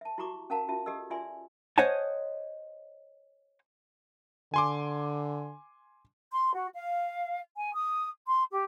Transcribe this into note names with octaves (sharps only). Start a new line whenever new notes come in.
E5 A5
E4 F#4 G4 A#5 C#6 D6
C#4 A#4 F5 F#5 A5 A#5
C#4 F4 F#4 E5 A5
G4 A4 D#5 E6
F4 D5 E5 G#5 C6
C5 C#5 D#5 F#5 G#5 A5
D3 G#5 C6 D6
C6
F#4
F5
G#5
D#6
C6
G4